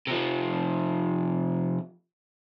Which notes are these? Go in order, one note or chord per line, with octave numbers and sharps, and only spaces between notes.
C3 F3